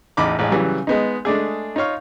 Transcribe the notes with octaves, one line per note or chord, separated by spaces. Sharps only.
A1 E2 D#4 B5 D6
A1 G#3 C#4
C#3 E3 F#3 G3
G#3 B3 D#4
G#3 A3 D4 G#4
D#4 F4 C#5 F5